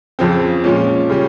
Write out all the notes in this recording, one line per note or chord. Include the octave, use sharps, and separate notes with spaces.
F2 C#3 F3 C4
A#2 F3 G#3 C#4
C#3 G3 C#4